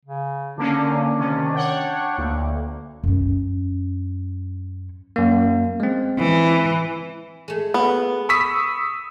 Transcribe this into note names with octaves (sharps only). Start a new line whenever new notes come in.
C#3
D3 A#3 C#4 D4
C3 D#3 C#4
C#5 F#5 G5
D2 A#3
F#2 C#4
F#2 A#3
G#3 C4
E3
G#3 A3
B3
B5 C#6 D#6 E6 B6